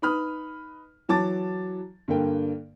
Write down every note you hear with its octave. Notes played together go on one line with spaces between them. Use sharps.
D#4 B4 B5 D#6 F6
E3 F#3 A5 D6 A6
G2 D3 A#3 G5